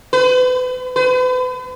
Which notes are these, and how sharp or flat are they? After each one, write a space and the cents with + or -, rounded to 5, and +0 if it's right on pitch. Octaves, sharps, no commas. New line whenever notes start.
B4 +35
B4 +40